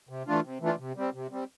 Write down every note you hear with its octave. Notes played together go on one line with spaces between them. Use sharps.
C3
E3 A3 D4 F4
C3
E3 A3 D4 F4
C3
G3 C4
C3
G3 C4